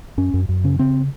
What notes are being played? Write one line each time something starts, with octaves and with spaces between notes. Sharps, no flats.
F#2 C#4
F#2
F#2
C#3 C#4
C#3 C4